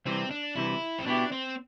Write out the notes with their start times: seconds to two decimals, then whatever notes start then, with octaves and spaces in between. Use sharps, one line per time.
0.05 C2 C3 E3 C4
0.31 D4
0.56 C2 C3 E3 E4
0.99 C4
1.06 B2 B3 D4 E4 G4
1.32 C4